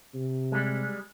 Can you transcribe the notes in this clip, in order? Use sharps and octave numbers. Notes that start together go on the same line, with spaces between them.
C3
G3 G#3